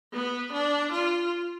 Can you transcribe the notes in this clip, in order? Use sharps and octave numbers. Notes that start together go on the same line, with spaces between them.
B3
D4
F4